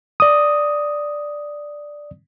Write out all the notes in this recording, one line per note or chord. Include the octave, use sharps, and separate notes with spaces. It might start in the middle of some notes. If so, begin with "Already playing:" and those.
D5 D#6